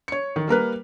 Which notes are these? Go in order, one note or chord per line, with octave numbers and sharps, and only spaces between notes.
C#5 C#7
D#3
G3 A#3 A#4 B4